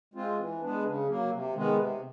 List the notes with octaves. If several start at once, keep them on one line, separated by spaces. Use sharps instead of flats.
G#3 C4 F4
E3
G#3 B3 D4
C#3
F#3 A#3
C3
D#3 G#3 B3
C3